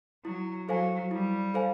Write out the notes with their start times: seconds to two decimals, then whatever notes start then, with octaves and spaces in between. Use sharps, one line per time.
0.25 F#3 E4
0.69 F#3 A4 C5 F5 G#5
1.11 G3 E4
1.54 A4 C5 F5 G#5